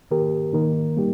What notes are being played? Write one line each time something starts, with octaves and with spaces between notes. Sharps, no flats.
D#3 A#3 G4 A#4
D#3 A#3 D#4 A#4
G3 A#3 G4